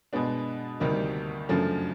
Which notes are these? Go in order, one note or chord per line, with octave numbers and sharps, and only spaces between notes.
B2 G#3 B3 D4
D2 C3 D#3 G3 A#3
F#2 C#3 F3 A3 D4